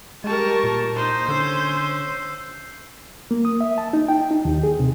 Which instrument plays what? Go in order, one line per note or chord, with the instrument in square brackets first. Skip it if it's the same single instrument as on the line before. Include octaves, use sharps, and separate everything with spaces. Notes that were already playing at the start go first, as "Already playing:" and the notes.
[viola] G3 A#4 [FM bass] G#3 [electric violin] A5 C#6
[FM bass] A#2
[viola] D#4 [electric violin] C5
[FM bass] D3 [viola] C#4 [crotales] E6 G6 C7
[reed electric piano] A#3
D#6
E5
A5
D#4
G5
D#4
D#2
G#4
C3